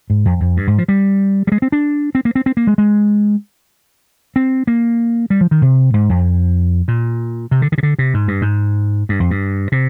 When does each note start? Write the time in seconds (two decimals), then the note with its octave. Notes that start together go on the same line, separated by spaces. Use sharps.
0.10 G#2
0.25 F2
0.40 F2
0.57 G2
0.67 G#2
0.78 F3
0.88 G3
1.47 G3
1.52 G#3
1.62 C4
1.72 D4
2.15 C4
2.25 A#3
2.35 C4
2.46 C4
2.57 A#3
2.67 G#3
2.78 G#3
4.36 C4
4.67 A#3
5.30 G3
5.41 F3
5.51 D#3
5.62 C3
5.94 G#2
6.09 F2
6.88 A#2
7.51 C3
7.62 D3
7.72 D#3
7.78 C3
7.83 D3
7.99 C3
8.14 G#2
8.28 G2
8.42 G#2
9.09 G2
9.20 F2
9.31 G2
9.72 C3